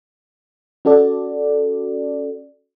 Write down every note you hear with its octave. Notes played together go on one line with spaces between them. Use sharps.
C#4 F#4 A4 D5